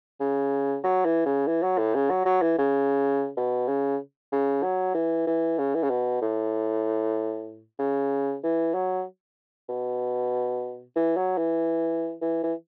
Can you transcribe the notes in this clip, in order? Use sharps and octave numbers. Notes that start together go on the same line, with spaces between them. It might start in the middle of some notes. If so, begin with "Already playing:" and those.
C#3
F#3
E3
C#3
E3
F#3
A2
C#3
F#3
F#3
E3
C#3
B2
C#3
C#3
F#3
E3
E3
C#3
E3
C#3
B2
A2
C#3
E3
F#3
B2
E3
F#3
E3
E3
E3